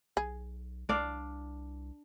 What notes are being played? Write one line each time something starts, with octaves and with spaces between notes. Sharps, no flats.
B1 G#4
C2 D4 D5 F5